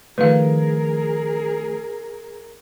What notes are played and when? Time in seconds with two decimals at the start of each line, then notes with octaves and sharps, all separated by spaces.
0.18 D#3 F3 A3 G#4 A#4 B4 F5